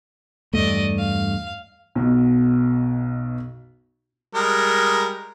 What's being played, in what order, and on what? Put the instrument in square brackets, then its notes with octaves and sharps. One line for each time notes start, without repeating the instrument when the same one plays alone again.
[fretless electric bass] E2 G2 A3 [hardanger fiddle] D5 D#5
[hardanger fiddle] F5
[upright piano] B1 B2
[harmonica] G3 G#3 A#4